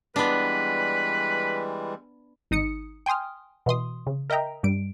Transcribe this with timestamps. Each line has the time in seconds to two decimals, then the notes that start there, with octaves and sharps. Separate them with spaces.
0.16 E3 G3 G#3 B3 D4 B4
2.51 G#1 D#4 D#6 C#7
3.06 G5 G#5 C6 D#6 F6
3.66 B2 E3 C6 D#6
4.07 C#3
4.30 A#4 D#5 E5 G5 A#5
4.63 G2 G3 D7